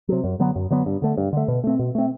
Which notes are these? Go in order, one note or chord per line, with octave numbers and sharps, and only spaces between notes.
C3 F#3
F#2
D3 F#3 B3
F#2
D3 F#3 B3
G2
D3 A3
G2
D3 A3
B2
A3 C4
B2
A3 C4